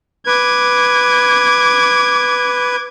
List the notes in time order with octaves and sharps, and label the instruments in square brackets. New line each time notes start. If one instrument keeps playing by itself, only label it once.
[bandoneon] B4 [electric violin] D6 G#6